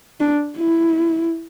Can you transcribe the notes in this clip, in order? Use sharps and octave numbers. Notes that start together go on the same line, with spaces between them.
D4
E4